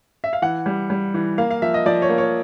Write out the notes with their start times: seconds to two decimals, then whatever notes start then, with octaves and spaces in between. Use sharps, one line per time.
0.24 E5
0.33 F5
0.42 E3 F#5
0.66 G3
0.90 G3
1.14 E3
1.38 A#3 F5
1.51 F5
1.62 F3 E5
1.74 D#5
1.86 F3 D5
2.02 C#5
2.09 A#3
2.18 C#5